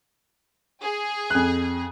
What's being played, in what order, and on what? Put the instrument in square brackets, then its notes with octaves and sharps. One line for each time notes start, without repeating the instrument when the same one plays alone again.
[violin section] G#4
[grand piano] F2 F#6